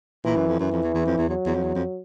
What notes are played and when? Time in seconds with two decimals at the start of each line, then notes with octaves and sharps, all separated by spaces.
0.25 A#2 E3
0.36 F#2
0.47 F2
0.59 F#2 E3
0.71 F2
0.83 E2
0.95 E2
1.06 F2
1.18 E2
1.29 E2 F#3
1.46 E2
1.55 F2
1.63 E2
1.75 F2